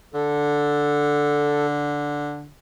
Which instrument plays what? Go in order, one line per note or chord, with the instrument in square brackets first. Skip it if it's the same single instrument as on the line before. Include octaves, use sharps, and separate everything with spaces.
[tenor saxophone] D3 [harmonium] A4